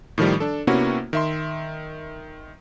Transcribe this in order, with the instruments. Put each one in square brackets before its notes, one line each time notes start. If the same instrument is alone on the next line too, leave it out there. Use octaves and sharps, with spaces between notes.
[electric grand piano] A2 D#3 F3 G3
D4 A4
C3 A#3 B3 C#4 E4 F#4
D#3 E5 C6